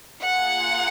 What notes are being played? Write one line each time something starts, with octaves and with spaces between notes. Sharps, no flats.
A#3 F4 G#4 F#5